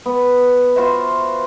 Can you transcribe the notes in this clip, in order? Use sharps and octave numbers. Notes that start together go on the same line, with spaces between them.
B3
F4 F#4 C5 E5